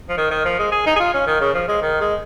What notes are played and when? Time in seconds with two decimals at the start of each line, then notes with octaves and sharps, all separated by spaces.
0.09 F3
0.17 D#3
0.31 D#3
0.45 F3
0.59 G#3
0.72 G#4
0.86 D#4
0.96 G#4
1.00 F4
1.13 C#4
1.26 D#3
1.41 C#3
1.54 F3
1.68 G#3
1.82 D#3
2.00 G#3